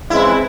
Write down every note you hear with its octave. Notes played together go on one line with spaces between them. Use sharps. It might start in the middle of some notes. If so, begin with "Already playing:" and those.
C#3 E3 G#3 C4 E4